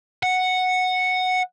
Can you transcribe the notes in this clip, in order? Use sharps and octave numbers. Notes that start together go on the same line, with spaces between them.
F#5